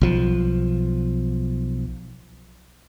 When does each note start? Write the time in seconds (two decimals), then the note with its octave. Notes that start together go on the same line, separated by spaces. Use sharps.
0.01 B1 F3